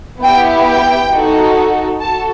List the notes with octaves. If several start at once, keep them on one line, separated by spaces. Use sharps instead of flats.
B3 E4 G4 G5
G5
D#4 F#4 A4
F#4 A4 A5